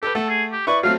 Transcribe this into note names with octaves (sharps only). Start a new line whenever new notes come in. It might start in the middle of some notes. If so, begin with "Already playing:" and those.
G4 A4 B4
A3 A4 F#5
G#4
G4
E4 B4 D5 C#6
F#3 A3 C4 F5